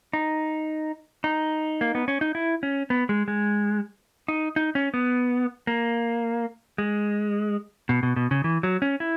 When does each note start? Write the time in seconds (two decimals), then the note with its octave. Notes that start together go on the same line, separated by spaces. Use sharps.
0.13 D#4
1.24 D#4
1.81 A#3
1.95 B3
2.08 C#4
2.21 D#4
2.35 E4
2.63 C#4
2.90 B3
3.09 G#3
3.28 G#3
4.28 D#4
4.56 D#4
4.75 C#4
4.94 B3
5.67 A#3
6.78 G#3
7.89 B2
8.03 B2
8.16 B2
8.31 C#3
8.44 E3
8.63 F#3
8.82 C#4
9.00 E4